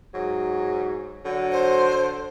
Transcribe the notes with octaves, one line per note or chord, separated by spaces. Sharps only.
G#2 F#3
D3 F#3
C5